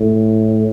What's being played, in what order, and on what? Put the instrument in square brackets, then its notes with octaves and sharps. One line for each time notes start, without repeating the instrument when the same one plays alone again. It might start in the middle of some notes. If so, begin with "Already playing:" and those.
Already playing: [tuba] A2